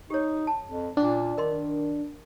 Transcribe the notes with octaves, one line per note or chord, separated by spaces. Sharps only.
D#4 G4 C#5
A5
F2
A#2 C#4 D4 D6
D#3 A#4 D#5 C6